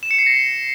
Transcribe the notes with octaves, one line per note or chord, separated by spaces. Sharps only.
E7
C#7
C7
A#6